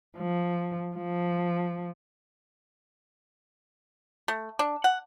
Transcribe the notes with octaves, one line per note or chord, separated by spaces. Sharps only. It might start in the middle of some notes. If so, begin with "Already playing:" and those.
F3
F3
A3
D4
F#5